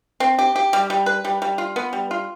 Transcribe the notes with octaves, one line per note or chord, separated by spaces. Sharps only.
C4
G4
G4
G3
G3
B4
G3
G3
F4
B3
G3
F4